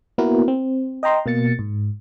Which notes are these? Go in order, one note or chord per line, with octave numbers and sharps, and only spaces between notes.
A#3 B3 E4 F#4 A#4 B4
C4
D#5 G5 A#5 C6
B2 A#3 A6 C#7
G#2